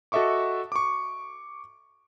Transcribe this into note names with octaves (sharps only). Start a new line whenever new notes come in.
F#4 A4 D#5 E5 C#6 D6
C#6 D6